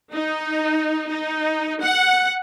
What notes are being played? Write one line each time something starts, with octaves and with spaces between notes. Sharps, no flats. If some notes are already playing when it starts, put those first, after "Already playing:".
D#4
D#4
F#5